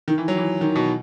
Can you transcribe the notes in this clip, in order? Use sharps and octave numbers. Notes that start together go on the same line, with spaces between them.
D#3
E3
F#3
E3
D#3
B2